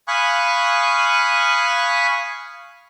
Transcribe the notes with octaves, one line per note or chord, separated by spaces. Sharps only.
F5 G#5 B5 C#6 D#6 F#6